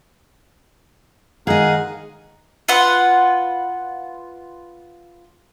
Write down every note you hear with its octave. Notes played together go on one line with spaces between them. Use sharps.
D#3 G#3 D#4 G#4 D#5 F5 F#5
F4 B4 F#5